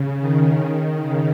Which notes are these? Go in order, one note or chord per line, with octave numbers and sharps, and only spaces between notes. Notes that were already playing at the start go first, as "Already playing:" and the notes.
Already playing: C#3
D#3
D#3
C#3